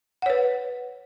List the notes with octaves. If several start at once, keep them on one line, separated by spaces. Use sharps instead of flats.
B4 C#5 F#5